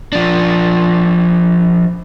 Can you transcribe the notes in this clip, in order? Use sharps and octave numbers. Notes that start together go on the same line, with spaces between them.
F3 D4